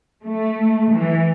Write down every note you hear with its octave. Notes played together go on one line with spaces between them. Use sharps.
A3
E3